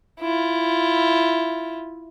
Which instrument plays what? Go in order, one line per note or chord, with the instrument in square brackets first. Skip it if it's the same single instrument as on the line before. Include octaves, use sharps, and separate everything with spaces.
[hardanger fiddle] E4 F4